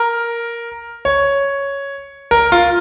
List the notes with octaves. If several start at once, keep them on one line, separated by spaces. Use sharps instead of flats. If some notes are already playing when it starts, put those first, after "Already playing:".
Already playing: A#4
C#5
A#4
F4